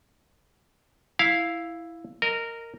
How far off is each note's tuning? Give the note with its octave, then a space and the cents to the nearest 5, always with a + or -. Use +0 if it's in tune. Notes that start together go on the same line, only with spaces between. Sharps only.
E4 +0 F5 +0
A#4 -15 D#5 +0